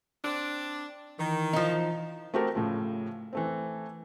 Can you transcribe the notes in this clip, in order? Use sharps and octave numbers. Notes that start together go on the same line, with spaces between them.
C4 D4
D#3 E3
F3 D#4
A3 C4 F#4 G4 A4 A#4
A2 C#3 F3
E3 A3 C4